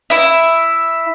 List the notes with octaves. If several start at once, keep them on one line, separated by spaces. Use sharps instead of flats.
E4 E5